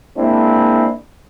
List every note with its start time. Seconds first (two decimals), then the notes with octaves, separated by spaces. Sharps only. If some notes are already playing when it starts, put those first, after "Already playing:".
0.17 G#3 A#3 C4 D4 E4